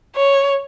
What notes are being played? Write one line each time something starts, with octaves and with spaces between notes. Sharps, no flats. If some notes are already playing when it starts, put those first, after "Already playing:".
C#5